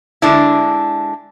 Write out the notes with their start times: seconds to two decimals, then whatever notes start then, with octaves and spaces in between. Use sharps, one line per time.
0.22 D3 G#3 D4 E4